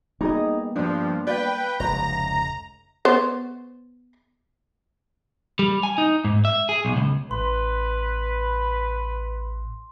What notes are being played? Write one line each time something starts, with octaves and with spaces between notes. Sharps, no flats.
G3 A#3 B3 D#4 G#4 D#5
G2 F3 D4 C5
B4 D5 F5 G5
F1 C#2 A2 A#5
B3 C5 C#5
G3
G#5
D#4
G#2
E5
G#4
B1
C#2
A1 B4 C6